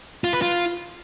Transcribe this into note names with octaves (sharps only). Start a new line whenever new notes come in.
F4
B4
F4